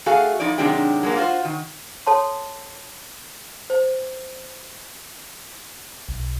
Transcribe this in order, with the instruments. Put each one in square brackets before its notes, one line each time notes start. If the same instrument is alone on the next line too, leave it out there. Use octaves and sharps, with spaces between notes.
[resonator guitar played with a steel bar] A3 F#4 G#4 A4 F5
F3 D#4 E4 D5
C3 D#3 F#3 G#3 D4 G4
F#3 G#3 A#3
F4 F#4 C5
D#3
[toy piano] A4 C#5 A5 C6
C5
[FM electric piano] B1